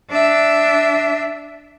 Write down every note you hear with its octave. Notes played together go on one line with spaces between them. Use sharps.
D4 E5